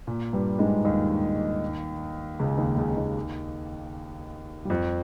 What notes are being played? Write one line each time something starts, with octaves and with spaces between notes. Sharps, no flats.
A#2
G2 G3
G#2 G#3
D#2 D#3
C#2 C#3
D#2 D#3
C#2 C#3
C#3
D#2 D#3
G3
F2 F3